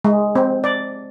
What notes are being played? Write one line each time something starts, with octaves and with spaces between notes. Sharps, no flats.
G#3
C4
D5